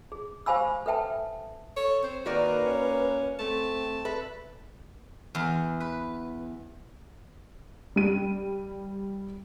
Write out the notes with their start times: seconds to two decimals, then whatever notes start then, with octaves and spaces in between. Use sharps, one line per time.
0.12 G#4
0.46 G4 C5 F5 G#5 B5 E6
0.86 A4 B4 E5 G5 A5
1.76 A4 C#5
2.03 C4 C5
2.26 D#3 A#3 F#4 A#4 B4 D5
2.66 C#4
3.39 A3 C4 A5
4.05 A4 B4 E5
5.35 E2
5.80 B4
7.96 G3 D#7